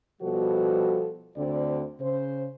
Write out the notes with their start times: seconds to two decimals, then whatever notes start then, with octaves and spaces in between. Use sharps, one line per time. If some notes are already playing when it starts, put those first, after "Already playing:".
0.21 B2 F3 G3 F#4 A4
1.36 D2 D3 C4 D5
2.00 C#3 C5